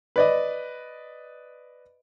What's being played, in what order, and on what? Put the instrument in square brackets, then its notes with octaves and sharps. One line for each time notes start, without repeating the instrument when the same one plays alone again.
[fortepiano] B4 D5 D#5